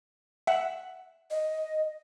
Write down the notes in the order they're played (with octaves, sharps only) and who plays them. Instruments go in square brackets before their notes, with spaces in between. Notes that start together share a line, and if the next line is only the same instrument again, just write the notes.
[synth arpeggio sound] E5 F#5
[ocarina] D#5